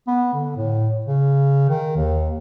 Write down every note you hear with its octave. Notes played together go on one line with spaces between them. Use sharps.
B3
D3
A2
C#3
D#3
D#2